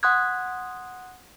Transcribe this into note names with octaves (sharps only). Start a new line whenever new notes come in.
F#5 C6 D#6 F#6 G#6